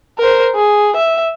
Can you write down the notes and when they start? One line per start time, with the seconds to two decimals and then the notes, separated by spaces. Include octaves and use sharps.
0.19 A#4 C5
0.56 G#4
0.96 E5